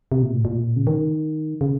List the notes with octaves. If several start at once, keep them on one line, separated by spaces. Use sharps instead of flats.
C3
A#2
A2
A#2
C#3
D#3
C#3